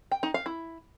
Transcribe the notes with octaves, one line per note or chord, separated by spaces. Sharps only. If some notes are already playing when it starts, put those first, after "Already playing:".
G5
D#4
F5
E4